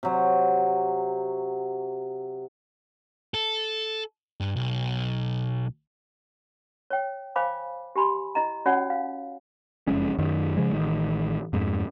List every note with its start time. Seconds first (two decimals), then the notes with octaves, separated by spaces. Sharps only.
0.03 C3 F#3
3.34 A4
4.40 G2
4.56 B1
6.90 C#5 G5
7.36 C5 F5 G#5 B5 D6
7.96 G4 G#5 B5 C6
8.35 E4 D#5 A#5
8.66 C#4 F#4 C#5 D5 F#5 G#5
8.90 F5
9.87 F#1 F2 G#3 C#4
10.18 F#2 D#3
10.57 C#3 F3 G#3
10.72 A1 D#3
11.53 F2 G#2